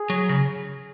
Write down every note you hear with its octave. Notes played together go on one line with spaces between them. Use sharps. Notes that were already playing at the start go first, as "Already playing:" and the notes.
Already playing: G#4
F#3
C#3